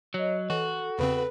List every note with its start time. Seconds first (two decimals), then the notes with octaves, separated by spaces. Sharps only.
0.14 F#3 C#5 D#5
0.50 E3 F#4 A4
0.99 E2 C#3 C4 B4